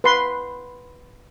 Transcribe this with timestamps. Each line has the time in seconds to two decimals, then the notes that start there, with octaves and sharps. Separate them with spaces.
0.04 B4 C6